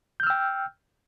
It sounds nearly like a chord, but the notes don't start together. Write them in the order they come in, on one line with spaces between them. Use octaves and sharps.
G6 F6 E6 G5